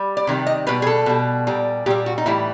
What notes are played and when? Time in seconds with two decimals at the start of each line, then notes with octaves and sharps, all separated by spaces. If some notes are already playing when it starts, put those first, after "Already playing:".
Already playing: G3
0.17 D5
0.27 C3 D#3 G3
0.46 D#5
0.67 B2 G3 B4
0.82 G#4
0.87 A4
1.06 B2 G3
1.47 A#2 G3
1.86 A#2 G3 G4
2.06 F#4
2.18 D#4
2.26 A2 E3 G3 E4